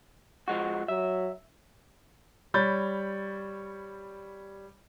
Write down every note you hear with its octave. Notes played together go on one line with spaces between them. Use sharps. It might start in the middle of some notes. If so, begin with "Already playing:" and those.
F3 G#3 F#4
F#3 E5
G3 C#5 B5 G6 A6